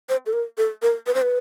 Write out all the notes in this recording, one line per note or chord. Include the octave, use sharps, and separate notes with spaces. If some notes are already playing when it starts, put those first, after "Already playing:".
C5
A4
A#4
A4
A#4
B4
C5
B4